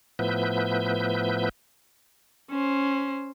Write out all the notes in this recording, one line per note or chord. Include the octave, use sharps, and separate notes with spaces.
A2 F3 B3 B4 E5 G6
C#4 C5